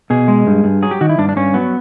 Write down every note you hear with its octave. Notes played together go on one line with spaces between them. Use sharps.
B2 G#4
G#3
G2
G2
F#3 G#4
G4
D#3 F#4
E4
G2 D4
D4
G2 C#4
F#3 B3